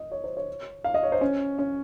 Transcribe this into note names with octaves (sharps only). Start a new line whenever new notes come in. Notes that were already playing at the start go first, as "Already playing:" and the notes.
Already playing: D#5
C#5
C5
C#5
F5
D#5
C#5
C5
C#4
C#4